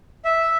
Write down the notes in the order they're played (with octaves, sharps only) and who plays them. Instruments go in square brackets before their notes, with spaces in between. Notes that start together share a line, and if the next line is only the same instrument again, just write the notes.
[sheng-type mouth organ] E5